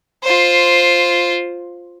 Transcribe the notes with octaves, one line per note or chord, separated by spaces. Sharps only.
F4 C5